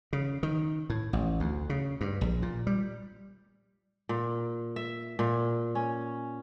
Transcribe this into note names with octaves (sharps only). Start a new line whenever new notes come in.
C#3
D#3
A2
A1
D2
C#3
G2
A#1
A#2
G3
A#2
E5
A#2
C#4